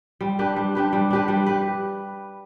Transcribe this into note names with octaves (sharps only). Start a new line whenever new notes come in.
G3
D4 G4 B4
G3
D4 G4 B4
G3
D4 G4 B4
G3
G4 B4